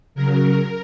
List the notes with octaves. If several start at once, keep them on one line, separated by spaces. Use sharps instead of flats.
C#3 F#3 A#4